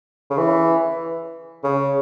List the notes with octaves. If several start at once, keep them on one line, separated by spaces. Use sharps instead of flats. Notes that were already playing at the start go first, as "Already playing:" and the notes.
C#3
E3
C#3